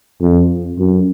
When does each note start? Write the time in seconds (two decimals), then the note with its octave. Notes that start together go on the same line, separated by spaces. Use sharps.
0.21 F2
0.78 F#2